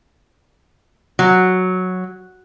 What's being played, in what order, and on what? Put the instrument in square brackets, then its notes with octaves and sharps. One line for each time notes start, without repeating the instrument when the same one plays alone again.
[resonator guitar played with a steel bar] F#3